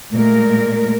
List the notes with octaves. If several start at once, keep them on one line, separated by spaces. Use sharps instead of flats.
A#2 G#3 A3 A#4